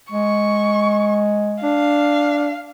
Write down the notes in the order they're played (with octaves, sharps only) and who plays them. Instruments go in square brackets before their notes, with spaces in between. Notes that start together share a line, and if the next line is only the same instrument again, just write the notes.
[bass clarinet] G#3 [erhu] C#6
[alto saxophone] D4 [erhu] F5